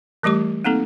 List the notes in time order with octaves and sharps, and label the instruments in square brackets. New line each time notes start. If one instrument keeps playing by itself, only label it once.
[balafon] E3 G3 A3 G4 D6
A#3 C4 D#4 A4